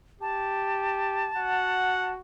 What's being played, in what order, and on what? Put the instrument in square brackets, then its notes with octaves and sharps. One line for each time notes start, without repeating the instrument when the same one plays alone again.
[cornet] G4 [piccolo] A5
[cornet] F#4 [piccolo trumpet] F#5